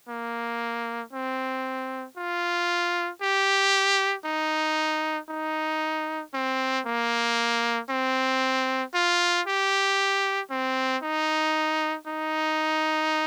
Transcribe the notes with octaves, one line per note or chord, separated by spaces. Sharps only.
A#3
C4
F4
G4
D#4
D#4
C4
A#3
C4
F4
G4
C4
D#4
D#4